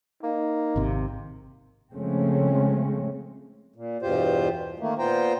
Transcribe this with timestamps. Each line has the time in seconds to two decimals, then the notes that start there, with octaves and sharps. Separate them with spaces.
0.23 A#3 D#4
0.76 G#1 C3
1.93 C#3 F3 G#3 A3 C4 C#4
3.76 A#2
4.02 E2 G2 B2 F4 G4 C5
4.79 D#3 A3 A#3
4.99 A#2 B3 F4 C5 G5 A#5